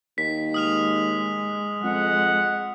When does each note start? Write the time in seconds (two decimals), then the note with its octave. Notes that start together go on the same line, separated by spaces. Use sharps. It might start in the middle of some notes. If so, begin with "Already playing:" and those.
0.18 D#2 B6
0.54 G#3 D#6 F6 F7
1.84 F2 G#3 F#5